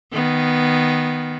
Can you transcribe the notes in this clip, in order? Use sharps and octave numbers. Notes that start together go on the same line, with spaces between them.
D#3 B3